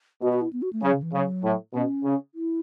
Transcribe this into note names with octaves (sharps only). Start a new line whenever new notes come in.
B2 F#4
F#4
E4
B3
F#4
A3
C#3 F#3
C#3
E3
C#3 F#3
A2
B2 C#4
C#3
E4